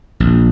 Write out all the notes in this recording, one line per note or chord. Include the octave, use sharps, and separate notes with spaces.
A#1